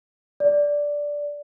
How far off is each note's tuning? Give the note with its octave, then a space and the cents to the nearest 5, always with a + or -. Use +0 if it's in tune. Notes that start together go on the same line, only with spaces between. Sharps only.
D5 -5